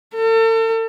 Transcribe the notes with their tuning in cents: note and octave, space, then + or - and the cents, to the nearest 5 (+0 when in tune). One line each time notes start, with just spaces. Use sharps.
A4 +40